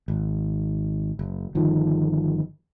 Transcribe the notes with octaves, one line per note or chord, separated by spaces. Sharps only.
G#1
F#1
G1 D#3 F3